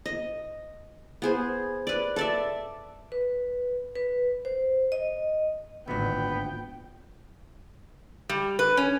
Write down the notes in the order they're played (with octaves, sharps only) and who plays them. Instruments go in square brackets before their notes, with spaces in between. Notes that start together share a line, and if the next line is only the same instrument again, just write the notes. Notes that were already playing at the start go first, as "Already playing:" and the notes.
[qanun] D#5
B3 G#4 C5
B4 D5
A4 D5 E5
[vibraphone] B4
B4
C5
D#5
[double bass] G#1 [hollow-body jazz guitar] D2 A#2 [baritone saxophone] B3 [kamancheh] G5
[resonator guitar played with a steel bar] G3
B4
C#4